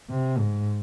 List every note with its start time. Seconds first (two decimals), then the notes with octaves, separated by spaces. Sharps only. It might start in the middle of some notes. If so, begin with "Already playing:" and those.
0.10 C3
0.38 G#2